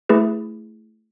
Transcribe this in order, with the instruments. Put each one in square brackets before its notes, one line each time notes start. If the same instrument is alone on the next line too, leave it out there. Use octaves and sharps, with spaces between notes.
[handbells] A3 E4 G#4 B4